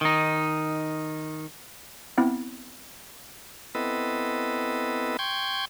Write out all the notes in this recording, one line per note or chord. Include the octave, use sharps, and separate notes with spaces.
D#3 D#4
B3 C4 E4
B3 C4 E4 A4 B4 D#5
G5 C6 C#6 G6 G#6